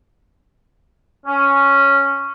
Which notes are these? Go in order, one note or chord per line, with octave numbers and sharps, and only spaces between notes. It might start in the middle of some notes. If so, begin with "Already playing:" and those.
C#4